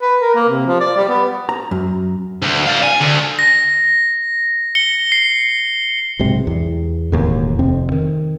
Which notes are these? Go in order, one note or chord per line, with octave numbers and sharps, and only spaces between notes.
B4
A#4
A#3
C3
F3
D5
G3
B3
A#5
F#2
D2
D5 F5
G#5
D2
A#6
C#7 G7
C7
B1 G#2 C3
E2
E1 D#2 A2
F1 F2 C3 C4
D#3